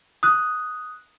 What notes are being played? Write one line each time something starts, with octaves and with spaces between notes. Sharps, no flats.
D#6 F#6